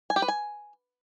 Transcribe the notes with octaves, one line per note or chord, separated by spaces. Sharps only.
G#5
G4
B4
G#5